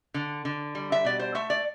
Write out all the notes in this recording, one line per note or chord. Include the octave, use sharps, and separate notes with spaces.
D3
D3
G3
E5
B2 D5
C5
A3 E5
D5